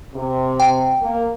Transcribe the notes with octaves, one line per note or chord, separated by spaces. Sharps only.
C3
G5
A#3